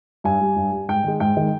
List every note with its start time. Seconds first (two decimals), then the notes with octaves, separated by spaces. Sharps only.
0.24 G2 G#5
0.41 G3
0.56 G2
0.72 G3
0.89 G#2 G5
1.04 D#3 G#3
1.20 G#2 G5
1.37 D#3 G#3